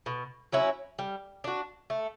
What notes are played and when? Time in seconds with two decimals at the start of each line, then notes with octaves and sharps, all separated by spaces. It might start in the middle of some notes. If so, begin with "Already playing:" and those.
0.06 B2
0.52 F#3 C#4 E4
0.99 G3
1.44 D4 F#4
1.90 A3